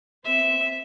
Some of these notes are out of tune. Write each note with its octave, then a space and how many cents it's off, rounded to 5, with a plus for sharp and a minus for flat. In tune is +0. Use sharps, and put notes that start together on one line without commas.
C4 +0 E5 -5